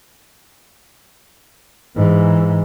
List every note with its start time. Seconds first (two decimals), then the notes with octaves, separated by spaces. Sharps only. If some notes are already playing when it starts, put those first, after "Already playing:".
1.96 G#2 E3